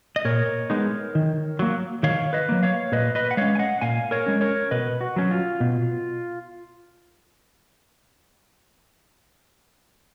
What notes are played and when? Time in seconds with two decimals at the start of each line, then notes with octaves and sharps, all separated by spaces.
0.16 D#5
0.25 A#2 A#4 C#5
0.70 G#3 B3 D#4
1.15 D#3
1.59 F#3 A#3
2.03 D#3 C#5 F5
2.33 B4 D#5
2.49 F#3 A#3
2.63 C#5 F5
2.92 A#2 B4 D#5
3.15 B4 D#5
3.31 F#5
3.37 G#3 C#4 C#5 F5
3.55 G#5
3.59 D#5 F#5
3.81 A#2 F5 G#5
4.11 A#4 C#5
4.26 G#3 C#4
4.41 A#4 C#5
4.71 B2 B4 D#5
5.01 F#4
5.16 F#3 C#4
5.31 F4
5.61 B2